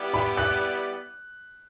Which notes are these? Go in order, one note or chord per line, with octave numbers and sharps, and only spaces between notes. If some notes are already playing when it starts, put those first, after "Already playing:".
Already playing: G3 B3 E4 G4 D5
B5
F#6